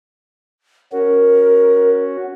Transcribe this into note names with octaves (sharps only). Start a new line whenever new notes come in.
C#4 F#4 A#4